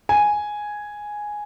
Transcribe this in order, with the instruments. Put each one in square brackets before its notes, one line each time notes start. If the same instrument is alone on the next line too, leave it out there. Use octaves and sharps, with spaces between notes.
[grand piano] G#5